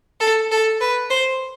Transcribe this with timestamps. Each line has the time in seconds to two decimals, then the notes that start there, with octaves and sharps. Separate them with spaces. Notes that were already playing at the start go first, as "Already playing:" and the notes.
0.20 A4
0.51 A4
0.81 B4
1.10 C5